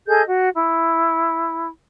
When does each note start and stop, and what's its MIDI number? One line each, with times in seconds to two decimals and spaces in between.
0.08 0.22 68
0.08 0.22 69
0.08 0.22 75
0.08 0.22 91
0.29 0.48 66
0.55 1.68 64